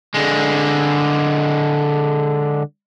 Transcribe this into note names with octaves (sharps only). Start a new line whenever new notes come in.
D3 G#3